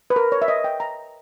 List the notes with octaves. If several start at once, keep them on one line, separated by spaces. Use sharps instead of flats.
B4
A#4
C#5
E5
D#5
G5
A#5